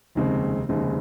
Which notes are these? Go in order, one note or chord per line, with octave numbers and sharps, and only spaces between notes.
F1 D#2 C#3 G#3 C4
F1 D#2 C#3 G#3 C4